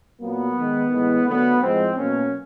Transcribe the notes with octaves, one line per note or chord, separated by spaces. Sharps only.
A#2 F#3 A#3 B3
D#3 G#3
A2 E3 G#3
D3 F#3 A3 B3
A2 F3 G#3 C4
B2 F#3 A#3 C#4